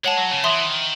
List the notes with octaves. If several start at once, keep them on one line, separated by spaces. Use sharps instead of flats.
G#3 C#5 F#5 A5
F#3
C#3
E3 E5 C6 D#6
D#3